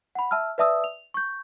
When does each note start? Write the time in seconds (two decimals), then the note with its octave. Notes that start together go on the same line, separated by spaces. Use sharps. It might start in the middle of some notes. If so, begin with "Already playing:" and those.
0.15 F#5 B5
0.31 E5 A5 E6 F6
0.58 B4 D5 E5 A5 D#6 E6
0.84 F7
1.14 C#6 G6